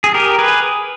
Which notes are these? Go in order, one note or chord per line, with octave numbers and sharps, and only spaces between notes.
G#4
G4 A#4
G#4 B4